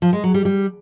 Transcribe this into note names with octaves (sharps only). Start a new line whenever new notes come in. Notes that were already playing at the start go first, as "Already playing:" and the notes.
F3
G#3
F#3
G3
G3